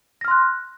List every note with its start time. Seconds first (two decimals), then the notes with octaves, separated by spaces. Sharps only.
0.21 A#6
0.25 F6
0.28 C6
0.31 F#6